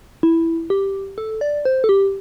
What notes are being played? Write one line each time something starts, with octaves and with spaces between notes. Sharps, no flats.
E4
G4
A4
D5
C5
A4
G4